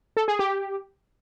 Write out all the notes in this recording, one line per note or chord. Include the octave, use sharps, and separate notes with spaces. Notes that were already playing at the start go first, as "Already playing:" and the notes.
A4
G#4
G4